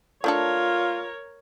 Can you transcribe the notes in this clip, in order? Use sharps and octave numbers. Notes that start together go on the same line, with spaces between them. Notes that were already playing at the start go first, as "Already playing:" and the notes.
A3 D4 F4 A4 A#4 C#5